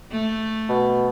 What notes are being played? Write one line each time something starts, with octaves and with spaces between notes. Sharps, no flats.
A3
B2